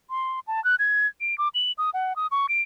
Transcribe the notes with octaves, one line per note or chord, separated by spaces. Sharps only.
C6
A5
F#6
G#6
D7
D6
F#7
D#6
F#5
D#6
C#6
D7